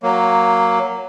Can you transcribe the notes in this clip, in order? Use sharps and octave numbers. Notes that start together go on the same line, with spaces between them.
F#3 A#3